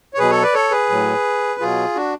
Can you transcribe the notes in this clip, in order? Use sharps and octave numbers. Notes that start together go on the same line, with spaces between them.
C#5
B2 F#3 G#4 B4
A4 C#5
B4 D5
A4 C#5
G#4 B4
A2 F#3
B2 F#3 F4 G#4
D4 F#4